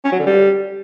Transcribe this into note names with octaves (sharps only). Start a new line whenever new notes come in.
C#4
F#3
D3
G3